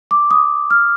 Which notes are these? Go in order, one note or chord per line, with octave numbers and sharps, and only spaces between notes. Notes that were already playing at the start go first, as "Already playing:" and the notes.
D6
D#6
F6